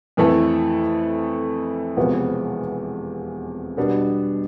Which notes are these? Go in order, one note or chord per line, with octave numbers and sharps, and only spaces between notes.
F2 E3 A3 E4 A4
E1 E2 C3 F3 B3
B2 G3 B3 D4